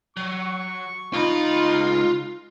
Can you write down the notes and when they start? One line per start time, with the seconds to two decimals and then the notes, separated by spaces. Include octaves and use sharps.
0.17 F#3 C#6
1.13 C#2 D#4 F4 B5 C6